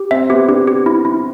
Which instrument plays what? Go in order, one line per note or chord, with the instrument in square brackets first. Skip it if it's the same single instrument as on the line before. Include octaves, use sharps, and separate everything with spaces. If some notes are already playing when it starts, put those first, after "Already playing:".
Already playing: [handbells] G4
[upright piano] C4 [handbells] E5
[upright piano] B3 [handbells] G4
[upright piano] D4 [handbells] G4
[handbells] G4
E4
E4